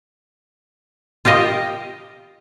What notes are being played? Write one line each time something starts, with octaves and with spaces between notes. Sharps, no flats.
F4 G4 A#4 D#5